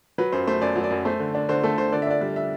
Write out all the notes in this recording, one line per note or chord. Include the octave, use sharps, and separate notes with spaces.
F#3 B4
F#2 C5
A3 C5
F#2 D5
F#3
D5
F#2
A3 C5
D3
D4
D3 C5
A3 A4
D3 C5
D3 D5
E5
D4 D5
G3
E5